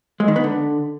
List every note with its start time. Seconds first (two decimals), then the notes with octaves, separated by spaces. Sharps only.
0.20 G#3
0.28 D#3
0.36 B3
0.44 D3